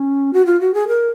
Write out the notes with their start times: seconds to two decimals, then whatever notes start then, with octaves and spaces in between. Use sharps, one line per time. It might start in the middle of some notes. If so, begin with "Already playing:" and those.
Already playing: C#4
0.33 F#4
0.46 F4
0.60 F#4
0.74 G#4
0.88 A#4